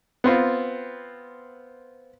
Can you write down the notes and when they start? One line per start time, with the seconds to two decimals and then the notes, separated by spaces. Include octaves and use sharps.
0.24 B3 C4 F4